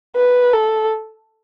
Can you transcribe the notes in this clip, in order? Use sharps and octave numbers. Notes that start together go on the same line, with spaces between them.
B4
A4